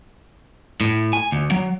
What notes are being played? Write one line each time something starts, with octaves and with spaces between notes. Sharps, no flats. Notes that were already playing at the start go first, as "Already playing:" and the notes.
A2
G#5
D2
F#3